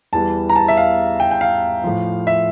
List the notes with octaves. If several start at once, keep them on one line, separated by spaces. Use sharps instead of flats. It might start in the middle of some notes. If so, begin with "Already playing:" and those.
E2 E3 G3 A5
A#5
A5
E5
F5
G5
G5
F5
A2 F3
E5